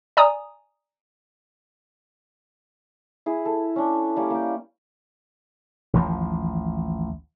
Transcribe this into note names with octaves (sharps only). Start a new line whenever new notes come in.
D5 G#5 A#5 D#6
E4 G#4
A4
C#4 D4
G3 A#3 C#4 D5
A#3 G5
A1 D#2 F3